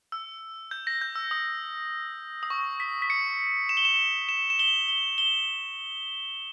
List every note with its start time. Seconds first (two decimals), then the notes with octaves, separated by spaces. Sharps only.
0.12 E6
0.71 G6
0.87 A#6
1.02 G6
1.16 E6
1.31 D#6
2.43 D#6
2.50 C#6
2.80 B6
3.02 B6
3.10 C#7
3.69 E7
3.77 G7
3.85 E7
4.29 E7
4.50 E7
4.59 G7
4.89 G7
5.18 G7